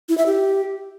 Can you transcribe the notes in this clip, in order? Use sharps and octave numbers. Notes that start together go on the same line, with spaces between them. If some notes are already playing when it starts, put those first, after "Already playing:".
E4
E5
G4